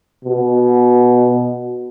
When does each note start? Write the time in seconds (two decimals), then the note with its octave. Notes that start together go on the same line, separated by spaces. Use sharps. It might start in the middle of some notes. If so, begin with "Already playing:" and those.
0.25 B2